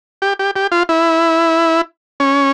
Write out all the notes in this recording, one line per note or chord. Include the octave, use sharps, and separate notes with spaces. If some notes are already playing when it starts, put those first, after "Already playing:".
G4
G4
G4
F4
E4
C#4